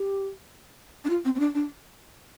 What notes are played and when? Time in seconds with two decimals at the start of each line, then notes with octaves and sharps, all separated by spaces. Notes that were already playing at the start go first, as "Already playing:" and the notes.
Already playing: G4
1.04 D4
1.10 F4
1.25 C4
1.35 C4
1.39 D4
1.55 D4